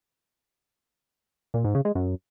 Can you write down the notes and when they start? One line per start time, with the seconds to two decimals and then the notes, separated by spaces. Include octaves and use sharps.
1.54 A#2
1.64 G#2
1.75 C#3
1.85 G#3
1.95 F#2